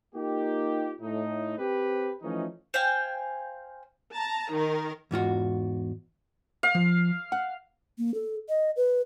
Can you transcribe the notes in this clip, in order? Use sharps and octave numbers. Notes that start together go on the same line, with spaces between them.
A#3 D#4 F4 G4
A2 A3 D#4
C4 G4 B4
E3 F3 A3 C#4 D#4
C5 F5 G5 G#5
A5 A#5
D#3 A#4
E2 G#2 F4 F#4
F5
F3
F#5
A#3
A4
D#5
B4